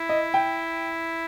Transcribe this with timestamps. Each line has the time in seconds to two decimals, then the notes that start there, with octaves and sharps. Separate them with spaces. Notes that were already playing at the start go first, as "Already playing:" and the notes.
Already playing: E4
0.09 D#5
0.34 G5